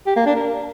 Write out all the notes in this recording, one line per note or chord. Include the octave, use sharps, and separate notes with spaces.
G4
A#3
D4
A#4